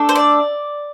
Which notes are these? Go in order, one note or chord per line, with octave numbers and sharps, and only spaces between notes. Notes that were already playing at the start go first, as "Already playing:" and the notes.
Already playing: A3 D4 A4
C5
D5